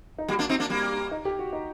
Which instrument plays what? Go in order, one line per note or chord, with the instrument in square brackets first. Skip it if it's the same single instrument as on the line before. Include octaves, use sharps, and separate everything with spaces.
[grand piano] D#4
[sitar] G3 A#3 [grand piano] F#4
[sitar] A#3 D4
C4 D#4
A#3 D4
G3 A#3
[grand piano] D#4
G4
F#4
D#4